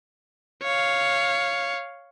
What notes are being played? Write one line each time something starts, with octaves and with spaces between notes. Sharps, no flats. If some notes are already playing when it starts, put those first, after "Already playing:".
C#5 F5